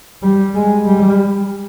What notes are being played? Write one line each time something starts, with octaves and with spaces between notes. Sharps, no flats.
G3
G#3
G3